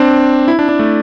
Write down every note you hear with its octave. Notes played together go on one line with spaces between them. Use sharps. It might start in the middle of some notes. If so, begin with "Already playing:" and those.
Already playing: C4 D4
E4
D4
D4
A3